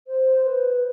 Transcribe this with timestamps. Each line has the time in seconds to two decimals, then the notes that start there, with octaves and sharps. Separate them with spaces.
0.07 C5
0.45 B4